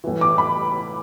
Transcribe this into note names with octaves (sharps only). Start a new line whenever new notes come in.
A2 E3
D6
B5